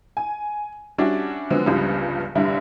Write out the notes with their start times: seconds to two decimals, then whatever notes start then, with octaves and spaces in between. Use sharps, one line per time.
0.17 G#5
0.98 G3 C#4 D4 E4 F#4 D5
1.50 D3 F3 F#3 G#3 B3 C4
1.66 G1 C#2 G2 C#3 F3 G3
2.35 F1 G2 D3 G3 E4 E5